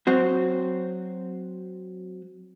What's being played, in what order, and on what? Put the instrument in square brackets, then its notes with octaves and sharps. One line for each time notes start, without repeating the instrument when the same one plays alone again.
[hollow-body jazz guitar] F#3 C4 F#4